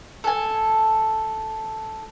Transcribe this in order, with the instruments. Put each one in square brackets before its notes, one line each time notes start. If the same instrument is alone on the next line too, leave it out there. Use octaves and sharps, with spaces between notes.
[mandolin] A4 G#5